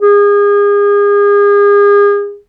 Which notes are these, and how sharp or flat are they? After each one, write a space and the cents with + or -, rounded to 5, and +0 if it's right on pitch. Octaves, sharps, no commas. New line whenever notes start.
G#4 -35